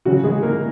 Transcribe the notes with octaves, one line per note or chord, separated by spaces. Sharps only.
C#3 F#3 C#4 F#4
G#3 G#4
A#3 A#4